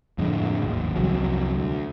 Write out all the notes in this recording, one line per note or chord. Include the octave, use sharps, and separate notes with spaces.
F2 A2 D3 G#3
G#1 D#2
C2 F2 F#3
D2